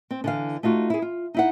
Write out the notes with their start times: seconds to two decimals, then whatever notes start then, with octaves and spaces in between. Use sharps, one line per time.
0.11 C4
0.24 D3 E3 F5
0.63 A3 D#4 F4 F#4
0.90 E4 G#4
1.02 F4
1.34 D#4 E4 F#5